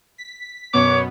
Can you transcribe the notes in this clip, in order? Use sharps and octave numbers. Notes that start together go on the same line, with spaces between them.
B6
F#2 B2 B3 C#5 D6